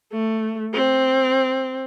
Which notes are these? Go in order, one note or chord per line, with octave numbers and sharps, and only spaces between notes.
A3
C4